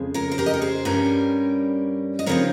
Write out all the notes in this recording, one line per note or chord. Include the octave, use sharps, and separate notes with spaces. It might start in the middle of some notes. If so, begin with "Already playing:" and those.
Already playing: F2 C#3 G#3
A#4 C#5
C5
G4 A#4
D#5
C#5
G#4 C5
G2 G3 C#4 A#4 C#5
D#5
C#3 F3 C4 D#4 A#4 C#5